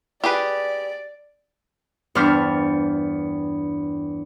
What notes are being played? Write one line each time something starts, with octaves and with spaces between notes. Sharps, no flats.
G4 G#4 B4 D5
E2 G2 G3 D4 C5 F6